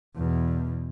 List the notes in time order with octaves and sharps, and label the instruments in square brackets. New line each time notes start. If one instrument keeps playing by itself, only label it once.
[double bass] E2 B2